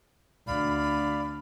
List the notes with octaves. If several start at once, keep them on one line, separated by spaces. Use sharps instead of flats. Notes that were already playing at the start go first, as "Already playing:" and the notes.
D2 D5 F5 B5